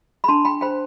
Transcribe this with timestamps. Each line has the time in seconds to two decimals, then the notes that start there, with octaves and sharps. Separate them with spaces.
0.24 B5
0.28 D4 A5 C6
0.45 G5 B5
0.61 C5 G5 B5